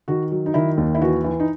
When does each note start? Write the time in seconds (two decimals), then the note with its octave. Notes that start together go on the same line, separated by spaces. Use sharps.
0.08 D#3 F#4
0.32 F#3
0.46 D#4
0.54 D#3 E4
0.77 D#2
0.95 E4
1.02 E3 F#4
1.24 E3
1.40 D#4